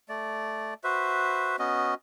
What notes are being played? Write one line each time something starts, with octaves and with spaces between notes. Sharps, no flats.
A3 D5
F#4 B4 C5 E5
B3 C#4 F#4 D#5